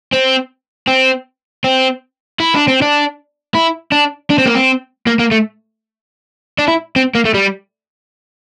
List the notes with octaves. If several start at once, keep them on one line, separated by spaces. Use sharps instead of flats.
C4
C4
C4
E4
D4
C4
D4
E4
D4
D4
C4
A#3
C4
A#3
A#3
A3
D4
E4
C4
A#3
A3
G3